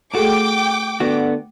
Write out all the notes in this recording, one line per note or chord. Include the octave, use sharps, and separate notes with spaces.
A3 F#4 G#4 A4 G5 D6
D3 B3 F#4